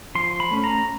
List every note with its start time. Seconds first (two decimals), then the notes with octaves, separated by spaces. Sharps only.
0.15 F3 C6
0.40 B5
0.51 A3 C#4
0.64 A#5